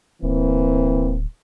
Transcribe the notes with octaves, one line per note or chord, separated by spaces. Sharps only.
D1 E3 A#3 C4